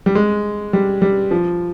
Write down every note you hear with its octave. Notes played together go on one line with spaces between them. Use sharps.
G3
G#3
G3
G3
F3